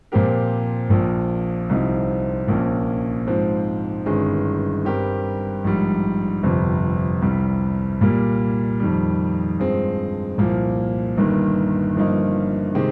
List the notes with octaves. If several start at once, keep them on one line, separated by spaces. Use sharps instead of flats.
A#2 F3 C4 G4 A#4
A#1 A#2 F3
C2 C3 F3 C4 D#4
A#1 A#2 F3 A#3 C#4
G#2 F3 C4
G1 G2 D#3 G#3 C#4
G2 G3 C4 G4 A#4
A#1 G#2 G3
G1 F2 C3
C2 C3 G3
A#2 G3 A#3
F2 D#3 G3
G2 F3 G#3 C4
C2 A#2 F3 A#3
G1 G2 D#3 A#3
G1 G2 F3 A#3 D#4
C3 D#3 G#3 C4 G4